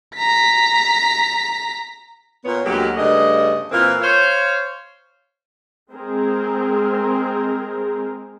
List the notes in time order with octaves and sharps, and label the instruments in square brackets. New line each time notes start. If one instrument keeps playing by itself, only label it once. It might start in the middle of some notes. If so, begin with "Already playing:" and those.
[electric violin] A#5 B6
[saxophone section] A#2 B3 C#5
D2 F#3 G#3 A#3 F#4 G4
G2 C#3 A3 D4 D#5
A#2 E3 C4 F4 A#4
C5 C#5 F5
[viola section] G#3 C4 G#4 A#4